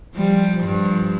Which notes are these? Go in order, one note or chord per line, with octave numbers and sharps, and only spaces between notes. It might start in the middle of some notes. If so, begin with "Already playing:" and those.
F3 G3
G2 F3